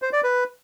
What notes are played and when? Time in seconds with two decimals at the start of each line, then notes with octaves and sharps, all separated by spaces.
0.02 C5
0.13 D5
0.24 B4